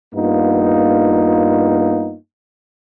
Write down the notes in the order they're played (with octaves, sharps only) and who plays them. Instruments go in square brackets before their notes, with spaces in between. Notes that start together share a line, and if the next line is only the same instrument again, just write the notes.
[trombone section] G2 A#3 B3 D#4 F4